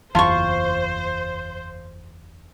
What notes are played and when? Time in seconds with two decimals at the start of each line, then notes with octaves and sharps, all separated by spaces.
0.15 F#1 E2 F4 C5 A5 C6 C#6